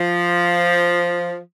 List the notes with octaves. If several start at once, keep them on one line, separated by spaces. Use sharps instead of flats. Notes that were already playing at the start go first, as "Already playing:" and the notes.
Already playing: F3